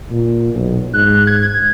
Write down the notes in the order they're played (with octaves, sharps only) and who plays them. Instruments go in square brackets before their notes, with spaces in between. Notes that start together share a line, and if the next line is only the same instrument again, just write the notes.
[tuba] A#2
B1
[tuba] G#2 [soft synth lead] F#6
[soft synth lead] G#6